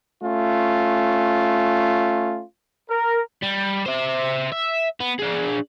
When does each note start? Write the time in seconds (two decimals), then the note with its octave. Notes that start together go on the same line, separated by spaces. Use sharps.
0.23 A3 C#4 F4
2.90 A#4
3.42 G3
3.86 C5 E5
4.52 E5
5.00 B3
5.20 D4 G#4